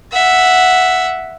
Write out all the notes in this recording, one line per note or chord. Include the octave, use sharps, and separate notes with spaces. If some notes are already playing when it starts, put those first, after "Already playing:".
E5 F#5